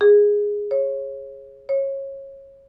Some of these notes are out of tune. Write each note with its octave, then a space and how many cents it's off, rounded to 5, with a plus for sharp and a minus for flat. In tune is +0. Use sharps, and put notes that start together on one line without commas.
G#4 -5
C#5 -25
C#5 -25